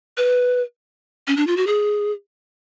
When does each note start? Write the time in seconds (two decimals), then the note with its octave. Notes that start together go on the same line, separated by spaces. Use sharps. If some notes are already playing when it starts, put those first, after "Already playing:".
0.17 B4
1.27 C#4
1.37 D4
1.47 F4
1.57 F#4
1.67 G#4